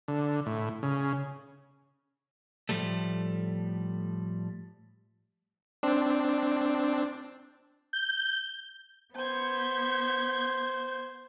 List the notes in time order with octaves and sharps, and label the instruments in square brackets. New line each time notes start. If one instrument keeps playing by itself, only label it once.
[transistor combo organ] D3
A2
C#3
[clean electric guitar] A2 F3 G3 A3
[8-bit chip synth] C4 D4
[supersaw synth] G6
[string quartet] B3 G6 G#6 [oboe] C5